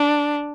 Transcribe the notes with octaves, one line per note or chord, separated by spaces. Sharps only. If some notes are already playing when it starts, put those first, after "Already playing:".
Already playing: D4